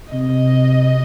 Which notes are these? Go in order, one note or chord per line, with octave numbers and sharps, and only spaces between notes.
C3 D#5